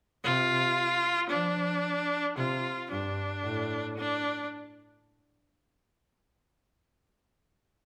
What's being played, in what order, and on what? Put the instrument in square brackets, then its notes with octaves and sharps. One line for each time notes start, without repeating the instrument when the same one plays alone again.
[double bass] C3 [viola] F4
[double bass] F3 [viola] D4
[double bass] C3 [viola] F4
[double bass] G2 [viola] D4
[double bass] A2
[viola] D4